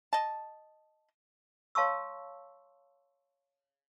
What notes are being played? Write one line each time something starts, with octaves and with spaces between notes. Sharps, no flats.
D#5 A5
C#5 F5 A5 C6 C#6 E6